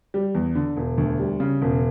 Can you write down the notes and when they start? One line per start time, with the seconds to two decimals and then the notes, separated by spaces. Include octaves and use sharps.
0.14 G3
0.35 E2
0.55 D3
0.77 E1
0.98 D2
1.19 G3
1.40 C#3
1.62 E1